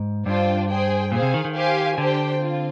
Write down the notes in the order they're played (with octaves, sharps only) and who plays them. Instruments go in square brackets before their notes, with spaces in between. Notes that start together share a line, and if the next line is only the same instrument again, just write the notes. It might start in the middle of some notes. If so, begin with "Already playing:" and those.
Already playing: [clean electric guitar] G#2
[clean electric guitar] G2 [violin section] D4 F4 C5 G5
[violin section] G#4 C5 G5
[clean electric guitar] A#2 [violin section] G#4 C5 F5
[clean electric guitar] C3
D#3
D#3
[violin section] G4 C5 F5 G#5
[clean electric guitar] D3 [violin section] D4 G4 C5 G5
[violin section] C4 F4